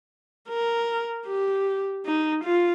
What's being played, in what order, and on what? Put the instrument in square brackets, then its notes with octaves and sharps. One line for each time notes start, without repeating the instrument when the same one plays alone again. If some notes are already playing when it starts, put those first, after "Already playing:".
[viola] A#4
G4
D#4
F4